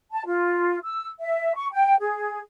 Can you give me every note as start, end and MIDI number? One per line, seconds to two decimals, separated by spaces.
0.12 0.24 81
0.26 0.79 65
0.84 1.08 88
1.20 1.54 76
1.55 1.67 85
1.73 1.95 79
2.00 2.40 68